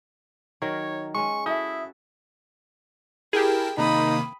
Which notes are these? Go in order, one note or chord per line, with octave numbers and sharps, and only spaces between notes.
D#3 F#3 A#4 C#5
G#3 C#4 C#6
E4 F#4 A4 E5 D#6
E4 G4 G#4 A#4 G5 A5
C3 D#3 A#3 D#4 B5 D#6